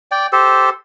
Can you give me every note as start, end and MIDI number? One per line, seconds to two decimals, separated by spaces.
0.11 0.27 74
0.11 0.27 79
0.33 0.70 67
0.33 0.70 69
0.33 0.70 72